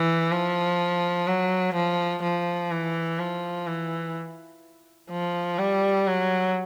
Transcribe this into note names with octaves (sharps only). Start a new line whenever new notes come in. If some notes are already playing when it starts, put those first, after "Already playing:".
Already playing: E3
F3
F#3
F3
F3
E3
F3
E3
F3
G3
F#3